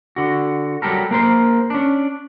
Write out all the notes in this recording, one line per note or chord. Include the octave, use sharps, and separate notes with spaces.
D3 F#4
F#3 G3 G4 A4 A#4
A#3 A#4 C5
C#4 D4